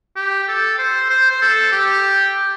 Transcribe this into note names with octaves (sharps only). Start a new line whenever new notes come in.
G4
A4
C5
C5
C5
A4
G4